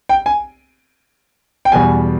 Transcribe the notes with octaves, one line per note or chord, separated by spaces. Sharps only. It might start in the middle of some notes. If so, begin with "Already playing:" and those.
G5
G#5
G5
E2 B2 G3 G#5